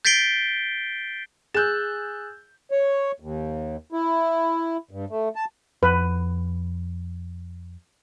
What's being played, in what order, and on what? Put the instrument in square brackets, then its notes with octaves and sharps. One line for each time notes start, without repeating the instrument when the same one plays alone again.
[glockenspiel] G6 A6 B6 C7 D7 G7
[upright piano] G#4 [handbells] E6 F#6 A6 [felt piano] G6 E7
[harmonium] C#5
D#2
E4
G2
A3
A5
[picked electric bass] F2 [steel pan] B4